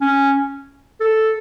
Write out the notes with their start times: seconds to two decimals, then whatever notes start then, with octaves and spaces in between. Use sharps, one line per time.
0.01 C#4
1.00 A4